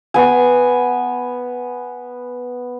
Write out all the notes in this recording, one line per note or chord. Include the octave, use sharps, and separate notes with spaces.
B3 G#5